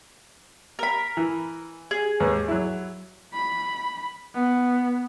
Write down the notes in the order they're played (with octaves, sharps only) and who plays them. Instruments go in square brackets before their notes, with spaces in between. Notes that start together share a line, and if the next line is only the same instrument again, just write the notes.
[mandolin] A#4 B5
[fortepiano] E3
[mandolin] G#4
[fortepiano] D#2 G#2 B4
F#3 E4
[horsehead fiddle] B5
B3